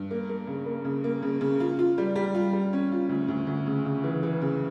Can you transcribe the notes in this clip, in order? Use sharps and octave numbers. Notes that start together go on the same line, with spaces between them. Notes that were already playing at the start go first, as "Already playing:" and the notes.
Already playing: G2
A#3
A#3
C#3
A#3
C#3
A#3
C#3
C#3
F4
F4
G3
G3
F4
G3
C#4
F4
D2
D2
D2
C#3
C#3
E3
E3
C#3